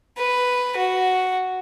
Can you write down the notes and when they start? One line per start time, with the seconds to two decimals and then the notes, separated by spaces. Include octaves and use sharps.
0.18 B4
0.77 F#4